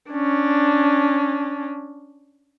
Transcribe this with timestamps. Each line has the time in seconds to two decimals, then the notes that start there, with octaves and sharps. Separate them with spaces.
0.11 C#4 D4